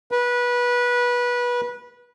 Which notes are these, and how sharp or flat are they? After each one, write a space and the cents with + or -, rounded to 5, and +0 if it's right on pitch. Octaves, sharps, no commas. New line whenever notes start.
B4 -20